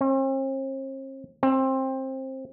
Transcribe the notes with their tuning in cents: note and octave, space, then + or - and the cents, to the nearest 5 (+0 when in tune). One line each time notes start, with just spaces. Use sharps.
C4 +45
C4 +20